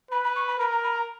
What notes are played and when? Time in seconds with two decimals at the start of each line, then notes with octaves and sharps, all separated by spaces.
0.11 B4 B5
0.23 B5
0.35 C#6
0.47 B5
0.59 A#4 B5
0.70 A#5
0.83 B5
0.95 A#5